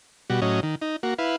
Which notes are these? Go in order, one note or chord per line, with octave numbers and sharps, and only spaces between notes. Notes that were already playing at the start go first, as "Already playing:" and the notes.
B2 G3 F#4
A2 F#3 C#4 D#5
D#3
D#4
A#3 F#4
E4 B4 F5